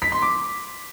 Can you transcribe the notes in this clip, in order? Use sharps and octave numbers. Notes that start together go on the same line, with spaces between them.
B6
C6
D6